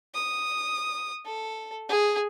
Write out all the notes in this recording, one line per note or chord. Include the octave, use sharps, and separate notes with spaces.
D#6
A4
G#4